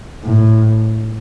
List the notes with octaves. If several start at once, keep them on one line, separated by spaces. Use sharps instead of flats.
A2